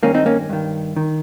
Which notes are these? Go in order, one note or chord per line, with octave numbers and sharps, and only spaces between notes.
G2 D#3 A#3 C#4
C4 D#4
A#3 C#4
G2 D#3
D#3